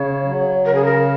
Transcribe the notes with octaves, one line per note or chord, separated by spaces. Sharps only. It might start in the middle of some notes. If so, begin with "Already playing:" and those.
Already playing: C#3 C#5
F#3
C#3 A#4
G#4
A#4